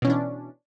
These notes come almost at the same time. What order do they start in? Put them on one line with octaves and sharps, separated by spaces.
B2 C#4 E3 D4